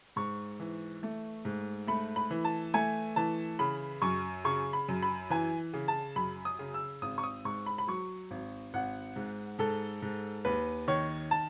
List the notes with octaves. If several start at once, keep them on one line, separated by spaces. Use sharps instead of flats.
G#2 C#6
E3
A3
G#2
A3 B5
B5
E3
A5
A3 G#5
E3 A5
C#3 B5
F#2 C#6
C#3 C#6
B5
F#2
B5
E3 G#5
C#3
A5
F#2 B5
D#6
C#3
E6
G#1 D#6
C#6
D#6
G#2 C#6
B5
B5
F#3 C#6
G#1
G#1 F#5
G#2
G#2 A4
G#2
D#2 B4
D#3 C#5
A5